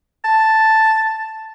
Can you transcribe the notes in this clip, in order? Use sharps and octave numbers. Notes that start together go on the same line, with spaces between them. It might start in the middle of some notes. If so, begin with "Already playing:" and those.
A5